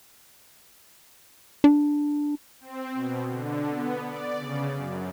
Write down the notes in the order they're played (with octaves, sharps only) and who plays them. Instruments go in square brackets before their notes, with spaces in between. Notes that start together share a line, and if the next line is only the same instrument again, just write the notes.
[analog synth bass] D4
[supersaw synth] C4
B2
D3
B3
D5
C#3
F#2